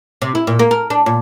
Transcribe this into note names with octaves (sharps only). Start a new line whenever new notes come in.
C3
E4
A#2
A#3
A#4
D4
A#2